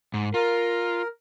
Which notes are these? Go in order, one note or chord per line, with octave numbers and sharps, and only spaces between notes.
G#2
F4 A#4